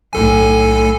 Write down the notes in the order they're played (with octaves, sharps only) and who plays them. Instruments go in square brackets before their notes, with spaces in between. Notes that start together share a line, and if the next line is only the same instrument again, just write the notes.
[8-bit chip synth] B1 A4 G#5 [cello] A2